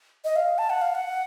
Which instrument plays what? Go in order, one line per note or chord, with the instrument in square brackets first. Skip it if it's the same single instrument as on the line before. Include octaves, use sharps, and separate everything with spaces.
[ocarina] D#5
F5
A5
F#5
F5
F#5